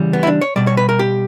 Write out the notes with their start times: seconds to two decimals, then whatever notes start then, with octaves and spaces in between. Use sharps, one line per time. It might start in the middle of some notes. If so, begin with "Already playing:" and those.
Already playing: C#3 E3 G3
0.13 B3
0.23 E4
0.27 D4
0.41 C#5
0.56 B2 G3 D5
0.67 C#5
0.77 B4
0.89 A#4
0.99 G4